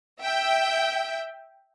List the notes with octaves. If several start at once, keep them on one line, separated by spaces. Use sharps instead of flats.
E5 G5